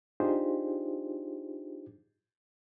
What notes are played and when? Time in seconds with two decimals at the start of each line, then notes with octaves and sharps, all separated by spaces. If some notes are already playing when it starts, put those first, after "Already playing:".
0.20 D4 D#4 F4 G4 G#4 C5